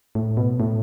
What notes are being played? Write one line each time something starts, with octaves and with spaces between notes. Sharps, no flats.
A2
B2
A2